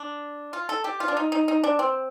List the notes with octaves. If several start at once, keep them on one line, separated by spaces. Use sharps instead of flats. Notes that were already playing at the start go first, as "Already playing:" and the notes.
Already playing: D4
F4
A4
G4
F4
D4
D#4
D#4
D#4
D4
C4